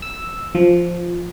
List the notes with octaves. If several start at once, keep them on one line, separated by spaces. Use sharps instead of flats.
E6
F3